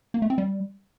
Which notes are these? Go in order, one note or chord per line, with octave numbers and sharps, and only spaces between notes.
A#3
A3
C4
G3